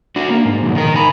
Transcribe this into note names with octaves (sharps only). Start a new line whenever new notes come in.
D4 F#4
A#3
G#2
B1 F2
D#3 A#4
G#5 B5